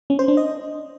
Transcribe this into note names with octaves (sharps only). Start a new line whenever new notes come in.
C#4
C5
D4
D#5